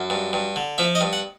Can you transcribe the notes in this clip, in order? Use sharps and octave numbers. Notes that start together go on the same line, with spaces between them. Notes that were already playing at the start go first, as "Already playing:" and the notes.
Already playing: F#2
G2
G2
D3
F3 E5
D#5
G2
F#5